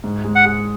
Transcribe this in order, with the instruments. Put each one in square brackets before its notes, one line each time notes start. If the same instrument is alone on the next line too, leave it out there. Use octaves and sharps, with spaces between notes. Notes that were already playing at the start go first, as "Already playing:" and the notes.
[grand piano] G#2
G#3
[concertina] F#5
[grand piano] G#4